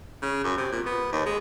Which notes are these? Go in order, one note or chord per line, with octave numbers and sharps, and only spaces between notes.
C#3
F#2
C3
A#2
B3
D#2
G#3